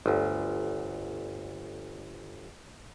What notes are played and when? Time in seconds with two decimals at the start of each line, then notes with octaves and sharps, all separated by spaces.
0.06 G1 D2